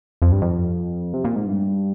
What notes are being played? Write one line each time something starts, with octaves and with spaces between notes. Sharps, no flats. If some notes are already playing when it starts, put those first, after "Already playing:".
F2
G2
F2
C3
A#2
G#2
G2